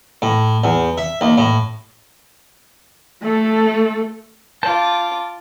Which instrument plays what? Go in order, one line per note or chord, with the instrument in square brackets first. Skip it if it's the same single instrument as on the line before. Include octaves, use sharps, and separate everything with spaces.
[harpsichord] A2
E2
E5
D#2
A2
[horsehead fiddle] A3 A4
[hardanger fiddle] F4 D6 [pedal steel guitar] A5 G6